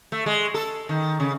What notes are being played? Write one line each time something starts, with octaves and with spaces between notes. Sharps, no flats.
A3
G#3
A4
D#3
C#3